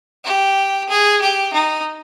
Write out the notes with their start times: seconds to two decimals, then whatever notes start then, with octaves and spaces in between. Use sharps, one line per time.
0.25 G4
0.89 G#4
1.21 G4
1.54 D#4